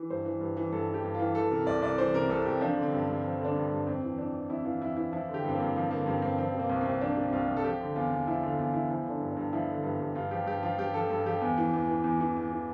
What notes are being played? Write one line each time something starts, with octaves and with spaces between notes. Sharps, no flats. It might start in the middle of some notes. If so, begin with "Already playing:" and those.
Already playing: E3
G2 C5
E3
G2
E3
G2 A4
E3
G4
G2
E3 F4
E3 A4
C3 A#4
C2 D5
C2 D5
E3 C5
C3 A#4
C2 A4
C2 G4
F3 D4
D3
C4
G2
C4
G2
F3
D3 D4
G2
G2
F2 C4
E3
F2 D4
E3
F2 E4
E3 F4
F2 E4
E3 E4
F3 E4
D3
G4
G2 C4
A#3
G2
F3
D3 A#3
G2 C4
G2 C4
F3 C4
C3 A#3
C2
C2 C4
F3 D4
C3
C2 F4
C2
A4
F3 G4
D3
E2 F4
E2
F3 E4
D3 F4
E2 F4
E2 E4
F3 E4
D3 D4
G2
D4
G2
F3 E4
D3
G2
G2
G2 F4
F3 G4
G2 G4
F3 F4
G2 G4
F3 A4
G2 A4
F3 G4
E2
E3
E2
E3
E2
E3
E2
E3